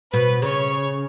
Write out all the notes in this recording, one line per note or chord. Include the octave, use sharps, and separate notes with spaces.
B2 B4
C#3 C#5